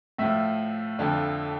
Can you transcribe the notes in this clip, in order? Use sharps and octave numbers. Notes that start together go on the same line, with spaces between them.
A2 F3 E5
F2 D3 F3